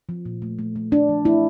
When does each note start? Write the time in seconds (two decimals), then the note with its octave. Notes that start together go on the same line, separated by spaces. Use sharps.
0.09 F3
0.26 A#2
0.42 A3
0.59 A3
0.76 A3
0.92 A3 D4
1.09 F3
1.25 A3 E4